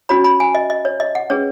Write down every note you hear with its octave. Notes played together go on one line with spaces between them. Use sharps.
C#4 F#4 C#5 B5
B5
G#5
D#5
D#5
C#5
D#5
F#5
C#4 G#4 B4 C#5